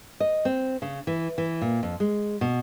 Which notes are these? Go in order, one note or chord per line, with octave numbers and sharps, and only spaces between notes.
D#5
C4
C#3
E3
E3
A#2
F2
G#3
B2